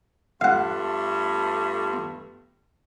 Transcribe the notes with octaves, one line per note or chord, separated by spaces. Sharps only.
G2 A3 B3 F4 F5 F#5